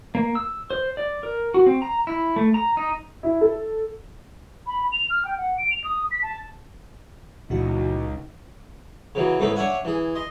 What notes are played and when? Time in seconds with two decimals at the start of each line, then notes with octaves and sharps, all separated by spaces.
0.15 A#3
0.35 E6
0.70 C5
0.97 D5
1.23 A#4
1.54 F#4
1.66 C4
1.82 A#5
2.07 E4
2.36 A3
2.54 A#5
2.77 D#4
3.23 E4
3.41 A4
4.67 B5
4.92 F7
5.10 F6
5.25 G5
5.38 F#5
5.58 D7
5.71 F7
5.84 D#6
6.11 B6
6.23 A5
7.50 C#2 A#2 E3 D4 D#4 F#4
9.15 C#3 E3 F#3
9.39 G#2 C#3 A3 B3 E4
9.56 D4 C#5 E5 F#5 G#5
9.85 E3 G#4
10.15 D#5 C6